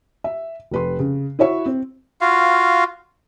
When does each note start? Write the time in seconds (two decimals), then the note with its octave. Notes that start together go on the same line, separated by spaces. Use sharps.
0.24 E5
0.71 F1 B4 C6
0.99 C#3
1.39 E4 F#4 C#5 E5 C#6
1.66 C4
2.21 F4 F#4 F5